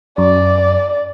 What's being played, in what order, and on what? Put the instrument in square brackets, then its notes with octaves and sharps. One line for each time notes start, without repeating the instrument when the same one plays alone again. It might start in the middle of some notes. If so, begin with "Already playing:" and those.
[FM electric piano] F#2 [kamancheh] D5